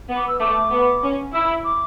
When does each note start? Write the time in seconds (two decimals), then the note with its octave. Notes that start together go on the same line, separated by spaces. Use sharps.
0.09 B3
0.16 D6
0.28 E6
0.40 A3 D6
0.71 B3
1.03 C#4
1.33 E4 E6
1.64 D6